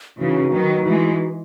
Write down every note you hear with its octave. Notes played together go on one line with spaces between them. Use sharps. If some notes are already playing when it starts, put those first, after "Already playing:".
C#3 E3 D#4 F#4 B4
D#3 F#3
E3 G#3